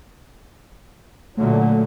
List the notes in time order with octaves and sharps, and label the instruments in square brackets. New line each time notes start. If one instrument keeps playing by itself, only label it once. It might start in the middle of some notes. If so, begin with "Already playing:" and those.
[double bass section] A#2 D3 F#3 [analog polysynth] A3